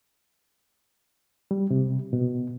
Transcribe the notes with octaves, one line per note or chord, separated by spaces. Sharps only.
G3
C3
B2